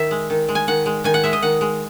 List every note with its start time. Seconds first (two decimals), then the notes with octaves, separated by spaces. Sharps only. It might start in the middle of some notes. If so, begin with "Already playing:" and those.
Already playing: D#3 E5
0.11 G#3
0.30 D#3
0.48 G#3
0.55 G#5
0.68 D#3 F#5
0.86 G#3
1.04 D#3 G#5
1.14 F#5
1.24 G#3 E5
1.33 D#5
1.43 D#3 F#5
1.61 G#3